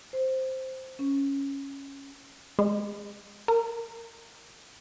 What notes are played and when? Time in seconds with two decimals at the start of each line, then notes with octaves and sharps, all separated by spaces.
0.13 C5
0.99 C#4
2.59 G#3
3.48 A#4